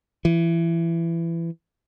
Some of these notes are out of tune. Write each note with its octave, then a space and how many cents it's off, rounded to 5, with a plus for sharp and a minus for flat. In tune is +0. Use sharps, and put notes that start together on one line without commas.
E3 +20